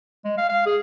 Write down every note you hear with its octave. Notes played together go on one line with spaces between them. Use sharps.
G#3
F5
F5
G#4